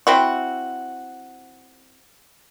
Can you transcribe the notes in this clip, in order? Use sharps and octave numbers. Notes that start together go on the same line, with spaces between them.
C4 E4 F#4